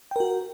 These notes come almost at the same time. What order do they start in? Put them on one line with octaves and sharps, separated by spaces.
G5 A#4 F#4